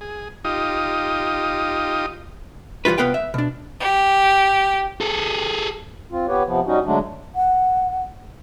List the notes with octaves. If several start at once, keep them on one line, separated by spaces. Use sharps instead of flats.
G#4
D#4 F4 G4 D#6
E3 F3 G3 F4 B4
C2 G#2 B3 B4 F5 G5
E5
B2 D4
G4
G#4 A4
C4 F4
B3 G4 B4 C#5
C3 F3 B3
G3 C#4 D#4 F#4
D3 F#3 G#3 A3 D4
F#5